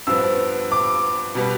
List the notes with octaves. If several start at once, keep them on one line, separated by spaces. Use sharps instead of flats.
G2 F3 B3 E6
D6
B2 G3 B3